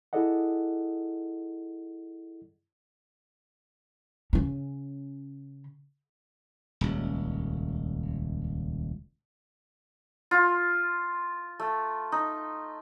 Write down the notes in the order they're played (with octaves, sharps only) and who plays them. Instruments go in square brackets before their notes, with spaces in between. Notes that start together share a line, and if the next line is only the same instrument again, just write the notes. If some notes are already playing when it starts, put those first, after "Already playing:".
[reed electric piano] E4 G#4 A4 D5 D#5 F#5
[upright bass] C#3 C#4
[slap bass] D#1 C#2
[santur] F4
A3
D#4